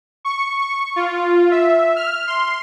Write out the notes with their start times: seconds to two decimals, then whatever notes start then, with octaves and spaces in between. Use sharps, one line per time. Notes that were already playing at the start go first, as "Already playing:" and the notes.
0.25 C#6
0.60 C#6
0.96 F4
1.51 E5
1.96 F6
2.27 C6